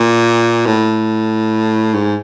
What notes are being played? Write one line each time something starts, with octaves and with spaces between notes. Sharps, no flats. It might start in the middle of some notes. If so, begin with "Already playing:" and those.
Already playing: A#2
A2
G#2